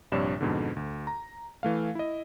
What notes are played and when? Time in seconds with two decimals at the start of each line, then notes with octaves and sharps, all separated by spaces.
0.12 A#1 G2 C3 C#5 D5 E7
0.41 F2 G#2 B2 D3
0.76 D2
1.07 A#5
1.63 E3 A3 F5
1.95 E4 D#5